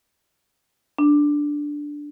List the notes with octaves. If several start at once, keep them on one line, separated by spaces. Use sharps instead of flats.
D4